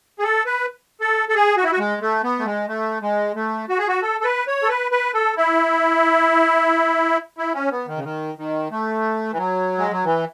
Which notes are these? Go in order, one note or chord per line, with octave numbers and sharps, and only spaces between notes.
G#4
A4
B4
A4
A4
G#4
F#4
E4
F#4
G#3
A3
B3
A3
G#3
A3
G#3
A3
F#4
G#4
F#4
A4
A4
B4
C#5
A4
B4
B4
A4
E4
E4
C#4
B3
D#3
C#3
D#3
D#3
A3
E3
F#3
G#3
F#3
E3